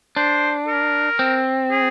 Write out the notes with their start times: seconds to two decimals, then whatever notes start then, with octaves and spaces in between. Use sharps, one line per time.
0.16 D4 C5
0.68 A#4
1.19 C4
1.71 G#4